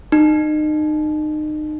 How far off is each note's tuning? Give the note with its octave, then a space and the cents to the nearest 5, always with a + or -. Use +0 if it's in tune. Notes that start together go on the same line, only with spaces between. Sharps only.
D#4 -30